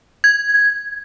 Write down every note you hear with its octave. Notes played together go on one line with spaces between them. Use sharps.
G#6